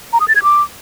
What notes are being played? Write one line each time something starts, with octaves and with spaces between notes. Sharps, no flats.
A#5
D#6
A6
G#6
D6